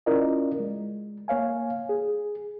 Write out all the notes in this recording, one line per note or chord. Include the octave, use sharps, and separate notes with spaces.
C#4 E4 F4 A#4 D5 D#5
G#3
A#3 C#5 F5 G#5
G#4